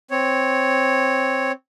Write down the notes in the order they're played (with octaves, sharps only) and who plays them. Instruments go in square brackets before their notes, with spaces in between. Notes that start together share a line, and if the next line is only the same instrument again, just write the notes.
[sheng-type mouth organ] C4 C#5